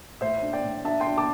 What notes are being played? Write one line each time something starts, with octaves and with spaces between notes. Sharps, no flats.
A2 C5 E5
D4
D5 G5
A2
D4 E5 A5
G5 C6
D4
A5 D6